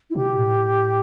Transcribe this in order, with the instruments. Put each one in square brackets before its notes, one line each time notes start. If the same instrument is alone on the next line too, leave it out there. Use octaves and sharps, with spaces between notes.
[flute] E4
[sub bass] B2 [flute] G4
[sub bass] A2